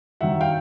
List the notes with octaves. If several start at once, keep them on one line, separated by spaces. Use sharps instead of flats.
G2 D#3 F#3 E5 F#5
F5 G5